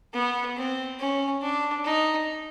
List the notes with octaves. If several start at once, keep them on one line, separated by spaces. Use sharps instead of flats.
B3
C4
C#4
D4
D#4